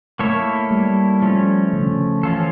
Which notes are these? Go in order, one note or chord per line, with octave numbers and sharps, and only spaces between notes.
A3 A#3 E4 A4 C#5
G3
F3 A3 C#4
C#3
D3
C#3
E3 F3 C#4 F4 A4